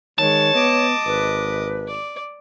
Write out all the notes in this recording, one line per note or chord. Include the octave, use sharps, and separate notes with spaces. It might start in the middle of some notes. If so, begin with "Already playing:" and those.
D#3 G#3 C#5 A5
B3 D#5 D6
G#1 B4
D5